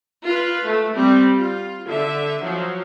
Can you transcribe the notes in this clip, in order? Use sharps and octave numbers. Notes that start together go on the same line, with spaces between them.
F4 B4
A3
G3 C4
F4
D3 E5
F3 F#3